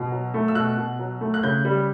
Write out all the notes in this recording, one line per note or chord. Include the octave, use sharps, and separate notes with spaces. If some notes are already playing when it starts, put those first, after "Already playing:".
Already playing: B2
F#3
A3
E6
B2 F#6
B2
F#3
A3
F#6
C#3 G6
G3